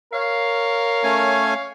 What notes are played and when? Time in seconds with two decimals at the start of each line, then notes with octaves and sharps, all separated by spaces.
0.13 A#4 C#5 F5
1.04 A3 C#4 G#5